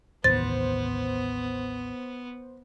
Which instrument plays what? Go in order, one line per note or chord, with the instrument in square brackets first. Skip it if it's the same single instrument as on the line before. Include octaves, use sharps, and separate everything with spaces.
[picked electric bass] A1 D#2 [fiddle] B3 [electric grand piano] C5 [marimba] A6